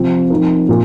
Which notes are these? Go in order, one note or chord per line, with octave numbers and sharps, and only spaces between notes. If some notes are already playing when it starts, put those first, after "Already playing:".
Already playing: C3 F3 C4 F4
F3 C4 D#4 A#4
A#2